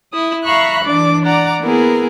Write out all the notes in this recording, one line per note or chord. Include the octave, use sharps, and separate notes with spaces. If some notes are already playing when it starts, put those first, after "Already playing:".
E4 D#6
E5 F5 A#5 B5 C#6 F#6
E3 D4 D5 D6
D5 F#5 A#5 D6
A#3 B3 E4 G#4 A#4